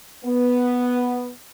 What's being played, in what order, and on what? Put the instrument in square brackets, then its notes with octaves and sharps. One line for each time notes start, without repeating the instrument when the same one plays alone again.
[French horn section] B3